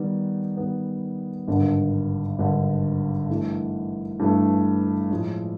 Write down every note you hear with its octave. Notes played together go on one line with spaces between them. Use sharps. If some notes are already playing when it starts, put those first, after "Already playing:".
Already playing: D#3 G3 B3
D#3 G3 B3
G#1 G2 D3
G#1 G2 D3
G2 E3 A3
G2 E3 A3
A2 F3 G#3